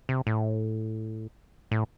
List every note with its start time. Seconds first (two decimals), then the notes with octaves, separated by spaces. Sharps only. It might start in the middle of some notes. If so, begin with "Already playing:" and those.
0.09 C3
0.27 A2
1.71 A2